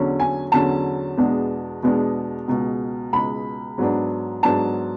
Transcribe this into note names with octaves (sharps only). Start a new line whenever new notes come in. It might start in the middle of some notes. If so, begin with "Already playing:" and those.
Already playing: E2 D3 F#3 C#4
G#5
E2 D3 F#3 C#4 A5
E2 B2 G#3 B3 D4
E2 B2 G#3 B3 D4
C#2 B2 G#3
C#2 B2 G#3 B5
G#2 F#3 B3 D4
G#2 F#3 B3 D4 A5